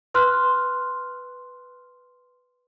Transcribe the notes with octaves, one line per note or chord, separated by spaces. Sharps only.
B4 C6 F6 F#6